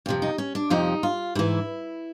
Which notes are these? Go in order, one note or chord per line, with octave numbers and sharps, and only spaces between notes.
F2 C3 F3
D#4
C#4
D4
F2 C3 F3 D#4
F4
G#2 E3 E4